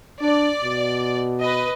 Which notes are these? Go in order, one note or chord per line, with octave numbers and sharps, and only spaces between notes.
D4 D5
B2
B4 D#5